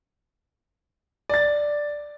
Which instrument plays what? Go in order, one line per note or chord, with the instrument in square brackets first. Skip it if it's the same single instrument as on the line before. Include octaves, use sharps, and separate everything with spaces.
[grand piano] D5 A6